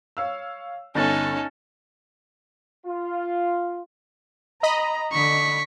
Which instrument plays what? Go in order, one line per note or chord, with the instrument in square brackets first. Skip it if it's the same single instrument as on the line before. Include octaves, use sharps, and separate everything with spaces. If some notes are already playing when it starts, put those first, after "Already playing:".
[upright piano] C#5 F5 E6
[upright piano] G1 A6 [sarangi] C#4 [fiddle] D#4 A4
[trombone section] F4
[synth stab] D#5 B5 [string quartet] A#5
[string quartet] D3 [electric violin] C#6 B6